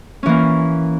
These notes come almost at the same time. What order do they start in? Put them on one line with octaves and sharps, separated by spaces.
C#4 E3 A#3